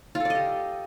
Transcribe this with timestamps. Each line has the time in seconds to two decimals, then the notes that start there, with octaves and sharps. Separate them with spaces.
0.15 F4
0.20 A4
0.25 D5
0.30 D#5
0.35 G4